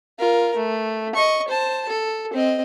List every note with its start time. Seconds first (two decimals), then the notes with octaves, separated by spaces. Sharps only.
0.19 F4 A#4
0.56 A3
1.15 D#5 C#6
1.48 C5 A5
1.89 A4
2.33 C4 D#5